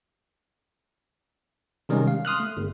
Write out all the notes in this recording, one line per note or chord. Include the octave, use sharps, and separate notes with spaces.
C3 D#3 G3 G#3 C#4
F5
C6 D#6 F6 F#6
A3
G1